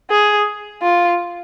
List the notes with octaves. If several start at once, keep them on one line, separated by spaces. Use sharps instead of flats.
G#4
F4